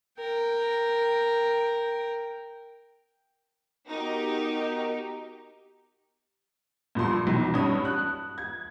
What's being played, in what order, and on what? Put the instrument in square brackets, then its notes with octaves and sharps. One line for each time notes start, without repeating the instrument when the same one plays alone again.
[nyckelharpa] A#4 G5
[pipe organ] B3 F#4 A#4 [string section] D#4 G4
[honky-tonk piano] G2 A#2 F3 C6
B1
G2 C#4 D#6
F#6
G#6